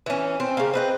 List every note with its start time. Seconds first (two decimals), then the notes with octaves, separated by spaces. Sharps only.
0.06 E3 C#4
0.40 C4
0.57 C#3 A#3
0.74 C4 B4 D#5